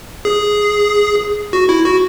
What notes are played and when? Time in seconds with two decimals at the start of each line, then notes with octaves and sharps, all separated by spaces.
0.25 G#4
1.53 F#4
1.69 E4
1.85 F#4